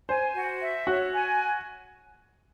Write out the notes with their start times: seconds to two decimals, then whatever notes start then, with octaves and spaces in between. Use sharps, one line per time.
0.09 C5 G#5
0.34 F#4
0.61 E5
0.87 F#4 C#5
1.13 G#5